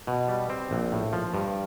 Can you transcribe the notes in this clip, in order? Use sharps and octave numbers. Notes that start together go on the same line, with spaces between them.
B2
G3
C4
A#1
A2
F3
G2